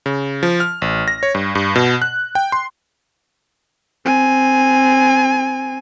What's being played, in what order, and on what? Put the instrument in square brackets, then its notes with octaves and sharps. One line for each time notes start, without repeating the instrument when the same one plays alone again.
[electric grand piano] C#3
F3
F6
A1
A#6
C#5
G2
G2
B2
F#6
G5
C6
[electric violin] C4 G#5